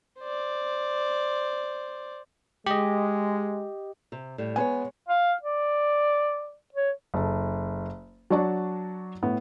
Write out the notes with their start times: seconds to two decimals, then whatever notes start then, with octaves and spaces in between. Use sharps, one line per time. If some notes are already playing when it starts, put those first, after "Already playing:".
0.19 C5 D5
2.66 G#3 G4 D#5
4.12 C3
4.38 A2 G3
4.56 G#3 B3 C5 C#5 G#5
5.09 F5
5.43 D5
6.74 C#5
7.14 F#1 A4
8.30 F#3 D4 F#4 D5 A5
9.23 A2 B3